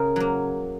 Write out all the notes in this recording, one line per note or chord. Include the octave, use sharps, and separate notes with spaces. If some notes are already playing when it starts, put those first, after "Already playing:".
Already playing: C#3 A#4
F#3 A#3